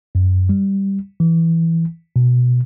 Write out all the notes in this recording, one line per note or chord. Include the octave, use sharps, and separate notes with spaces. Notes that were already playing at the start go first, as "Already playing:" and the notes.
F#2
G3
E3
B2